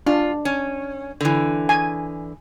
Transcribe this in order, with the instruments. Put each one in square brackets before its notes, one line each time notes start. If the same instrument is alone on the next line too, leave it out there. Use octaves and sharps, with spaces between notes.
[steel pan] D4 [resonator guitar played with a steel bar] F4
[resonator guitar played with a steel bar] C#4
D3 E3
[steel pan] G#5